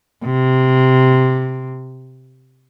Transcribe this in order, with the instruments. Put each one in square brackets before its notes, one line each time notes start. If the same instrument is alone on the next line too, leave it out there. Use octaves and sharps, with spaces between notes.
[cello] C3